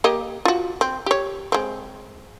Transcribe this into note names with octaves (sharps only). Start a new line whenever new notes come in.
A#3 G4 D#5
F4 F#4
C4
G4 C#5
G#3 C4